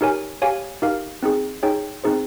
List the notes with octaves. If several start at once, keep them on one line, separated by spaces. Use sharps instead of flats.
D#4 G4 A#4 C#5 G#5
G4 C#5 F5 G#5
D#4 G4 A#4 F5
C4 D#4 G#4
D#4 G#4 C#5 G5
C4 D#4 G#4 C5